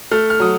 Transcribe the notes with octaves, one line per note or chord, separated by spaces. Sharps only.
A3 F6
F6
F#3 D#6